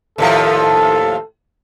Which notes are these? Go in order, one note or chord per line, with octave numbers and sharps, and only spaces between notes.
D#2 A2 F3 A4